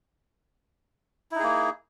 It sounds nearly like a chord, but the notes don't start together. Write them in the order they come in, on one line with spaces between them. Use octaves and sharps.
E4 D#4 G#4 A#3